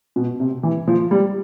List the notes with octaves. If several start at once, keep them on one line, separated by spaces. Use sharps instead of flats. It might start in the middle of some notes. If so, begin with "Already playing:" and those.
B2
C3
E3
F3
G3